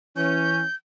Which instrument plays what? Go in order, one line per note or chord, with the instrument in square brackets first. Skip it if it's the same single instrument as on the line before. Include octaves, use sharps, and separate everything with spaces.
[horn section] E3 C#4 [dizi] G6